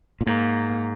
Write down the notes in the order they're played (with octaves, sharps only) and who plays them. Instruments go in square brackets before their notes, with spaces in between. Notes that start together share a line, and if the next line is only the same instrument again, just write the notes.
[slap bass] A#2
[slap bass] G#2 [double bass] A#3